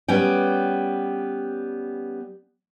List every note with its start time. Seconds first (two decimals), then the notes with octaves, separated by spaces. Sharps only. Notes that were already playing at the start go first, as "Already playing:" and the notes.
0.08 G3 B3 C#4 G5